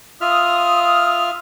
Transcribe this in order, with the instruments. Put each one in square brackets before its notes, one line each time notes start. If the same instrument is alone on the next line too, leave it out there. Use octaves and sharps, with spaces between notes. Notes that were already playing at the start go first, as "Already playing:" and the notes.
[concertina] F4 E5 F6 [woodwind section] D#6